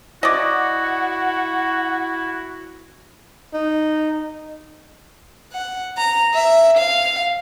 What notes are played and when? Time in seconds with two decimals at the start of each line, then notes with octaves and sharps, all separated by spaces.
0.23 E4 F#4 D5 D#5 F#5
3.53 D#4
5.52 F#5
5.98 A#5
6.34 E5
6.78 F5